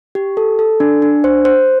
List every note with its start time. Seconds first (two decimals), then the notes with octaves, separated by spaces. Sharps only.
0.15 G4
0.37 A4
0.59 A4
0.80 D4
1.02 D4
1.24 C5
1.45 C5